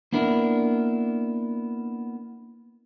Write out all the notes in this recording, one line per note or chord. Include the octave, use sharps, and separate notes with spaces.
A#3 B3 D4 E4 A#4